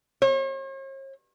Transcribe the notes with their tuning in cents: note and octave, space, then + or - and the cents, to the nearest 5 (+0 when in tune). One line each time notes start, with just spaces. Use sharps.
C#5 -45